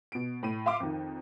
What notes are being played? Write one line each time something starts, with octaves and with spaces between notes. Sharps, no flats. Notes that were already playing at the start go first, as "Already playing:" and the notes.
B2 D7
A2 D#7
E5 F5 C6 D6
F2 D#3